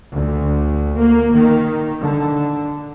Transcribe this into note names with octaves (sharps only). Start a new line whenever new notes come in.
D2
A#3
D#3
D3